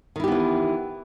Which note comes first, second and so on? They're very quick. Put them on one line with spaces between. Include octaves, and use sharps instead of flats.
D#3 E4 G4 B3 E3